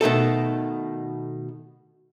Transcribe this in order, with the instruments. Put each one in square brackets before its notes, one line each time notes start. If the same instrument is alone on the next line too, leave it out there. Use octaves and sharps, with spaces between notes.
[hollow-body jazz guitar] B2 D#3 A3 A4